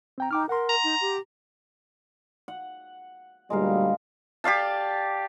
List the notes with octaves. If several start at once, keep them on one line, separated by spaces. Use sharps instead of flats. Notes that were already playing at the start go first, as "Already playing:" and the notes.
C4 G5 A#5
D#4 G5 D6 F6
A#4 F#5 C6
A#5
D#4
G4
F#5
D2 A#2 G3 G#3 A#4 F5
G4 D5 F5 A5